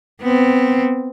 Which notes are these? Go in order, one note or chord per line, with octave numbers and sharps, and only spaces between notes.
B3 C4